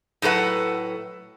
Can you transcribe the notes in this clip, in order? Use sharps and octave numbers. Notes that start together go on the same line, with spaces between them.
A2 F#3 A4 B4 F#5